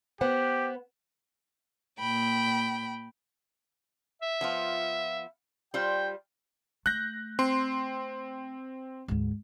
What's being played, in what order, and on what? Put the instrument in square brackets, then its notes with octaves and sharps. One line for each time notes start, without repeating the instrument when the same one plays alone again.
[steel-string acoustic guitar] B3 C5 F#5 [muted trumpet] G4
[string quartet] A#2 G5 B5
[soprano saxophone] E5
[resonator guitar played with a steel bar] F3 B3 F4
[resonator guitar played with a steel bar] G3 F4 C5 [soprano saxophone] G5
[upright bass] A3 [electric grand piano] F#6 G6 A#6
[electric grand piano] C4 C6
[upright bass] D2 G#2